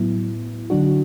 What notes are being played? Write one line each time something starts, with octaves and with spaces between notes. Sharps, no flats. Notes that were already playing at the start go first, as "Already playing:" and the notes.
Already playing: A2 F#3 B3 E4
D3 F#3 D4 F#4